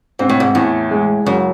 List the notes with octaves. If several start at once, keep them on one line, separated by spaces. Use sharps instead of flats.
G#2 C4
A2
G#2
E2 A2
G#3
F#2 C#3